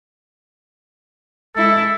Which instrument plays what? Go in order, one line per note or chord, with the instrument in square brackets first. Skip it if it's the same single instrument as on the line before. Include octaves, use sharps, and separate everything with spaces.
[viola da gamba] G#3 E4 [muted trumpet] A4